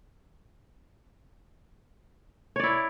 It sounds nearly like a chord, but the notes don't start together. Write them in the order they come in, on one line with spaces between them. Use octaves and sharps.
C#5 D5 E4